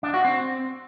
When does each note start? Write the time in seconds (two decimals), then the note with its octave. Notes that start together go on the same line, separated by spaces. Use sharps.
0.03 D4
0.14 F#4
0.25 C4